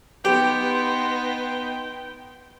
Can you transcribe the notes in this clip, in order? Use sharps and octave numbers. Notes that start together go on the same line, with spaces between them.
B3 D#4 G4 B4 G5 C6